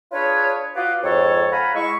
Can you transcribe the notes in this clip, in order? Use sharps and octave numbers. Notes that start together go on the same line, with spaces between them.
D4 F4 G#4 B4 C#5
F4 F#4 B4 D5 D#5 F5
F2 G#2 A4 C#5
F5 F#5 G#5 A#5 B5
G#3 E4 C#6